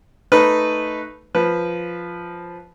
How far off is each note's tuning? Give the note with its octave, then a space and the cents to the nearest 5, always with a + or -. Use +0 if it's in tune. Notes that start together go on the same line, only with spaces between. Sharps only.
A3 +0 D#4 +0 B4 +0
F3 +0 B4 +0